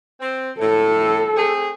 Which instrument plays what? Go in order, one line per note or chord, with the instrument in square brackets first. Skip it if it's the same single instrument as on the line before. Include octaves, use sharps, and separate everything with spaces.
[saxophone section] C4
[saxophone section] A2 [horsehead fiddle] A4
[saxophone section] A3 C4 G#4